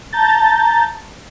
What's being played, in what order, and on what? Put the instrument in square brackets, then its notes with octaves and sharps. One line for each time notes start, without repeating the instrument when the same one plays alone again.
[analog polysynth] A5 A#5 G6 A6